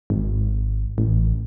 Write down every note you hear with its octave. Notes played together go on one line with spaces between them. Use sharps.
G#1
A1